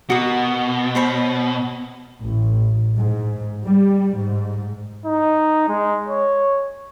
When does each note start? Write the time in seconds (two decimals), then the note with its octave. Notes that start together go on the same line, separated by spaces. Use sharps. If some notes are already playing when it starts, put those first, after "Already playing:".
0.10 B2 F#4 A#4 D#6
0.95 C5 C#5 B5
2.22 A1
2.96 G#2
3.67 G3
4.17 G#2
5.05 D#4
5.68 G#3
6.09 C#5